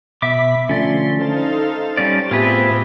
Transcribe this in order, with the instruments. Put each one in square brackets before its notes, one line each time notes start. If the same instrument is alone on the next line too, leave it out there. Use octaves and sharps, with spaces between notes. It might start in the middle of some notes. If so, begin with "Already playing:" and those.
[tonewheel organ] B2 B5 [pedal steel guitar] E5 D6
[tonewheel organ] D3 F3 A3 [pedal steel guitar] C#4 D5 [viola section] C6
[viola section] D#4 A4 F5 [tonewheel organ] C5 A5
[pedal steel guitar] G3 C#4 D5
[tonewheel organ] A2 B3 [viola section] C4 G4 E5 [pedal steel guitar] F4 G#4 B4